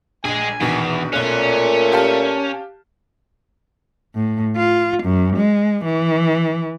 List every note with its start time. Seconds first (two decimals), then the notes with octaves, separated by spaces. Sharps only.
0.25 A#1 G#3 G#4 G#5
0.60 A#1 E2 B2 D#3
1.13 B1 A#2 A3 C#4 F#6
1.92 G4 F5 A5
4.15 A2
4.56 F4
5.04 F#2
5.37 G#3
5.85 E3